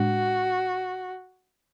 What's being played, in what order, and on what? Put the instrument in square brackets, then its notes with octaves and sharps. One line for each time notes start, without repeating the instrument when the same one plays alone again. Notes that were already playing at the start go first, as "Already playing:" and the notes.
Already playing: [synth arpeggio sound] A2 G#3 D4 [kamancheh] F#4